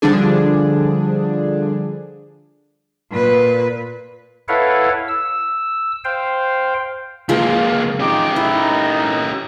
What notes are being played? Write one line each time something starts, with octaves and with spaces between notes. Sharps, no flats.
D3 F3 G3 D4 G#4
A#2 B4
E4 A4 B4 C#5 F5 F#5
E6
C5 F5 G5
C#2 F3 G#3 A#3
C#4 D#4 F4 G4 D6
D#4 E4 A#4 A#5